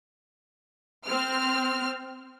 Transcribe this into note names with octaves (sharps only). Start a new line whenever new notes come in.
C4 F6